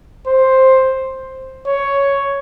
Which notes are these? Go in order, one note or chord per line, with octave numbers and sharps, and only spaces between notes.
C5
C#5